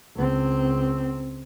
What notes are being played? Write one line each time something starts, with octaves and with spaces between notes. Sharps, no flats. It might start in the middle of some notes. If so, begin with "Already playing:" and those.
C#2 C4